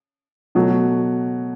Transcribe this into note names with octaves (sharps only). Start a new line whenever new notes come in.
B2 F#3 A3